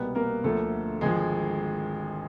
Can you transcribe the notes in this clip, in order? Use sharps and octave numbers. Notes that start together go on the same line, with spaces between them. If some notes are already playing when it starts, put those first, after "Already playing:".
Already playing: C2 B2 G3 A#3 B3 B4
A#3 A#4
D2 D3 F3 A3 A#3 A4
G#1 D3 F3 G#3 G#4